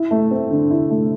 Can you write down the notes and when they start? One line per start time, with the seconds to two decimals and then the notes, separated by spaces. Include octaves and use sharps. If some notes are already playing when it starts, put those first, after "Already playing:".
Already playing: E4
0.11 A3
0.31 C4
0.50 D3
0.70 E4
0.90 A3